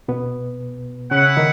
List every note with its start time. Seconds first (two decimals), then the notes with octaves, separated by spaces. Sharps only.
0.08 B2 B3
1.11 C#3 C#4 E4 B4 F#5
1.37 D#3 D#4